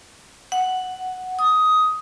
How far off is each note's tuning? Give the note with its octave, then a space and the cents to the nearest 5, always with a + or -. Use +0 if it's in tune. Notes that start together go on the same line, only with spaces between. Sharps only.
F#5 +5
D#6 +10